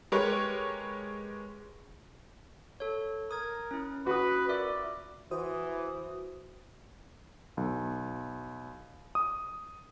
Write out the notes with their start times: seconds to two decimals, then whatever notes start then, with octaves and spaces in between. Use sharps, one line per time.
0.12 G#3 G4 A#4 B4 C#5
2.80 A4 C#5
3.31 A#4 D#6 G#6
3.71 C#4 E4
4.06 F#4 B4 D#6
4.49 F4 A#4 D5 E5
5.31 E3 F#4 C5 D#6
7.57 B1
9.15 D#6